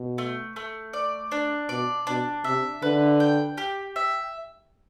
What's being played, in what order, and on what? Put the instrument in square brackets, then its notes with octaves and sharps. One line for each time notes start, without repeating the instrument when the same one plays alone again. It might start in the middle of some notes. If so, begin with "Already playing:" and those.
Already playing: [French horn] B2
[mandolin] A3
A3
D5
D4
[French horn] B2 [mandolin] D5
[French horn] B2 [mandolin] D4
[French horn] C3 [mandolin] E5
[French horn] D3 [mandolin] B4
[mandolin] G5
G4
E5